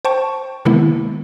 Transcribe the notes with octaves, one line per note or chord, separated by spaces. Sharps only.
C5 G5 A5 C#6
C3 D#3 G#3 A#3 B3 E4